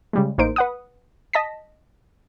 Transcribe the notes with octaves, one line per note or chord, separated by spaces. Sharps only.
C#3 G3 G#3
A1 A#3 D#4 C5 D7
B4 F#5 D#6
D#5 A5 A#6 B6